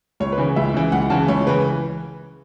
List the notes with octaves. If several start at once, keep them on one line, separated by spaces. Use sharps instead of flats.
C#2 C#5
B4
C#3 E3
C#2 E5
C#3 E3
C#2 F#5
C#3 E3 A5
C#2 C#5
C#3 E3 B4